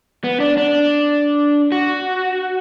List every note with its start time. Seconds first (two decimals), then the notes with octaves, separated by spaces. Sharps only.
0.24 B3
0.40 D4
0.57 D4
1.72 F#4